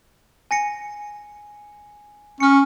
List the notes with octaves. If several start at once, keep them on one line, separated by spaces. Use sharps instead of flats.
G#5 A#6 C#7
C#4 F6 C#7